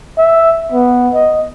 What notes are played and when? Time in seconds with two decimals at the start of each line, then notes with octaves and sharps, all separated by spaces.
0.18 E5
0.72 B3
1.14 D#5